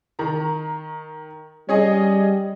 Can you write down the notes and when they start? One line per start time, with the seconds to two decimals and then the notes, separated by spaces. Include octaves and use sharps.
0.19 D#3 A#5
1.69 G3 C#4 G#4 D#5